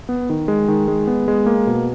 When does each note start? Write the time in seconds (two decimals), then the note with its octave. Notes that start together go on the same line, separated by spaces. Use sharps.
0.09 B3
0.30 D#3
0.48 G#3
0.68 D#3
0.88 G#3
1.07 B3
1.28 G#3
1.46 A#3
1.67 B2